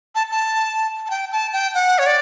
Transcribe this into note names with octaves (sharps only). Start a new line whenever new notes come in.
A5
A5
A5
G5
A5
G5
F#5
C#5
D5